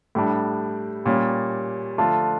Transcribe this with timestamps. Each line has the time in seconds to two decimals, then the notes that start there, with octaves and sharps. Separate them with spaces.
0.15 A2 G3 D4
1.06 A#2 G3 C#4
1.98 D3 F3 A3 D4 F4